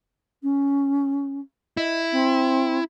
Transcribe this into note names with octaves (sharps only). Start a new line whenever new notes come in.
C#4
E4 D#5
C4